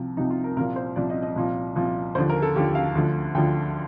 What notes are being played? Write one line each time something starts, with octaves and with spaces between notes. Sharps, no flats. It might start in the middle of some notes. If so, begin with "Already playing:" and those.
Already playing: C2 C3 F3
C2 C3 F3 D#4
F4
A#4
C2 A#2 F3 A#4
C5
C2 A#2 F3 D5
D#5
D#5
C2 A#2 F3
C2 A#2 F3
D#2 D3 F3 C5
A#4
A4
D#2 D3 F3 G4
F5
D2 D3 F3
D2 D3 F3 G5